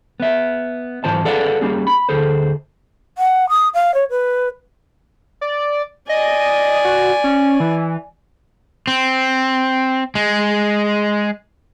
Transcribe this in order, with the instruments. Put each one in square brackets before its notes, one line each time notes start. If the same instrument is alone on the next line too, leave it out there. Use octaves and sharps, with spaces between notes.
[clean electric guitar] B3 E5
G#2 E3 F4 C5 A5
G#4 A4 B4 D5 F5 F#5
G3 A#3 C#4 D#4 G#4
B5
D2 G#4 A4 C5
[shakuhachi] F#5
D#6
F5
C#5
B4
[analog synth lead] D5
[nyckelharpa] D5 G#5 [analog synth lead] D#5
[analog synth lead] F#4
C#4
E3
[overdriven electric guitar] C4
G#3